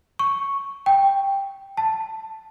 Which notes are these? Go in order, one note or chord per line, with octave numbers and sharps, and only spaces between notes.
C#6
G5
A5